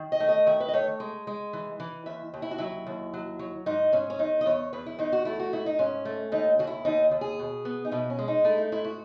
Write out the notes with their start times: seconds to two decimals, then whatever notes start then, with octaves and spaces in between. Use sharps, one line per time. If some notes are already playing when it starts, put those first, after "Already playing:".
Already playing: D#3
0.12 D#5
0.20 A3
0.29 D#5
0.46 D#3 E5
0.60 B4
0.68 D#5
0.74 A3 C#5
1.00 G#3
1.27 G#3
1.53 E3
1.80 E3
2.06 D#2 E5
2.34 D#2
2.42 E4
2.51 F#4
2.58 F#3 E4
2.87 D#2
3.14 F#3
3.39 F#3
3.66 G#2 D#4
3.92 G#2 C#4
4.10 C#4
4.19 E2 D#4
4.41 D#5
4.46 E2 C#5
4.73 E2 B4
4.86 E4
4.99 E2 D#4
5.12 F#4
5.25 A3 E4
5.40 F#4
5.53 G#2 E4
5.66 D#4
5.79 G#2 C#4
6.05 A3
6.32 D#2 D#4
6.59 D#2 F#4
6.67 E4
6.85 D#2 D#4
7.11 D#2
7.21 G#4
7.39 B2
7.65 B3
7.85 D#4
7.91 B2 E4
8.10 C#4
8.19 G#3
8.28 D#4
8.44 A3 E4
8.58 D#4
8.72 G#2 E4
8.84 F#4